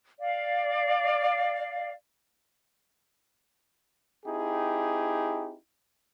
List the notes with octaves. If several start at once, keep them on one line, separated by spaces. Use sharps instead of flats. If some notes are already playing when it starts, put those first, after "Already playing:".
D5 F5
C4 D#4 E4 G4 G#4